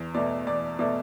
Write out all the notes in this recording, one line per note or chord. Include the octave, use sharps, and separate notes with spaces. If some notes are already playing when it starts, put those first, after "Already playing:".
Already playing: E2
B2 A3 D5
E2 D5
B2 A3 D5